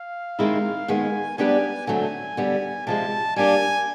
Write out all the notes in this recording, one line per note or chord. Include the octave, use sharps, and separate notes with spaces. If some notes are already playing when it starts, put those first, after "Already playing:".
Already playing: F5
D#3 G#3 C4 E4
D#2 D#3 G#3 B3 G#5
G3 B3 D4 G4 B4 G#5
D3 F#3 A3 C4 G#5
D3 G3 B3
C3 F3 G#3 A5
G3 A#3 D4 G4 G#5